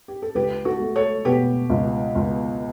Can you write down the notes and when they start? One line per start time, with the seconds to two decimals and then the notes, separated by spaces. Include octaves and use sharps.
0.08 G4
0.22 A4
0.35 C#2 G4 B4
0.65 F#4 A4
0.80 A3
0.96 A4 C#5
1.25 B2 G4 B4
1.70 C#2
2.15 C#2